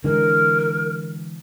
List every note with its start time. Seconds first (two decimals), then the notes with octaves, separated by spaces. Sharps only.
0.04 D3 E3 G#3 A#4